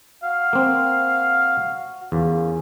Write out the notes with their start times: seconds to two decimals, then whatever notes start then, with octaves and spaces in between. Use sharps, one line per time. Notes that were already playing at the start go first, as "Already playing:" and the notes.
0.23 F#4 F5
0.53 A#3 C4
2.12 E2 A#3 C#4 F4